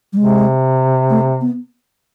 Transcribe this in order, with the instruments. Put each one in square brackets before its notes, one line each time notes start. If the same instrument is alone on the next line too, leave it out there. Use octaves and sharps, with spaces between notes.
[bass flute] G3
[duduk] C3 [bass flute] G#3
[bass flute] A3
B3